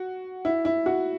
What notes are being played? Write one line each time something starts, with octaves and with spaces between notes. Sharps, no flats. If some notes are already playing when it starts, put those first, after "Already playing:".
Already playing: F#4
E4
E4
F#4